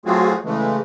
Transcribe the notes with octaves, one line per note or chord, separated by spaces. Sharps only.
F#3 A3 C4 F4 F#4 G#4
C#3 E3 G#3 A3